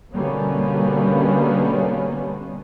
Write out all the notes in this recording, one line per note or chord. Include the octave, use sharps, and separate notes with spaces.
B2 D3 G3 A#3 B3 C#4